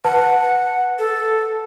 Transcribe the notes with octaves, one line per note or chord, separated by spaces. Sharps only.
B4 F#5 A5
A4